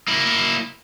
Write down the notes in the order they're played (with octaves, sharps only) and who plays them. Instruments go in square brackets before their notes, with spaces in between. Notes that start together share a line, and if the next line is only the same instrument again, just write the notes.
[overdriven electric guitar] A#3 E4